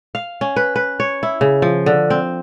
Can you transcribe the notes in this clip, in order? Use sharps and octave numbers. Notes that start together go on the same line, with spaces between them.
F5
C#4
B4
B4
C#5
E4
C#3
F3
D3
C4